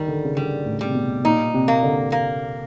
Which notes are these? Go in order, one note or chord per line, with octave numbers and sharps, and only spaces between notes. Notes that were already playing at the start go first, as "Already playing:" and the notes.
Already playing: D#3 G3
D3
C#3
D3 G3
A2
C3 G3
B2
A#2 D#4
C3
A#3
D3
A#3